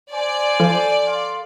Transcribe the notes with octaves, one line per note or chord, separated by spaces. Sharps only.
C5 D5 G#5
F3 A4
F5 C6